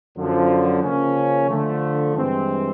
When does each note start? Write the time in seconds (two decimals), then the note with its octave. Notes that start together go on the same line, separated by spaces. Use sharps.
0.15 F#2 D3 F3
0.82 C#3 F3 A#3 C#4
1.48 D3 F3 A3
2.16 G2 E3 G#3 C4